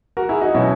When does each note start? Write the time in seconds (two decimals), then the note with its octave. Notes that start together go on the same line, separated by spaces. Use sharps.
0.17 F#4 A#4
0.29 E4 G#4
0.41 D#4 F#4
0.54 B2 F#3 C#4 E4